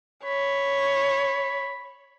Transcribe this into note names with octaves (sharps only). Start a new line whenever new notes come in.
C#5 B5